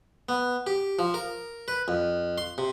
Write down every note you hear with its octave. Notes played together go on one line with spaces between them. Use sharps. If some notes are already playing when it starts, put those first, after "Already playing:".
B3
G4
F3
A#4
B4
F2
C6
C3